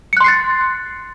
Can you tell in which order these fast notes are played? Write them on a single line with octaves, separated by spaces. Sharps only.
C#7 F#6 C6 C7 A6